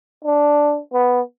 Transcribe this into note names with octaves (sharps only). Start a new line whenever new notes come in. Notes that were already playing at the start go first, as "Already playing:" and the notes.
D4
B3